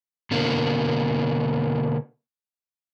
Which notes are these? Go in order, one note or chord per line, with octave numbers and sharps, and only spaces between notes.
B2 D3 A#3